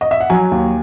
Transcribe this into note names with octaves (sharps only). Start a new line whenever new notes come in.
D#5
E5
F#5
F#3 G#5
D#2